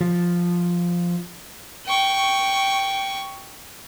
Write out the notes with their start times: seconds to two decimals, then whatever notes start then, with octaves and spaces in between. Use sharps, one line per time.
0.01 F3
1.86 G5 C#6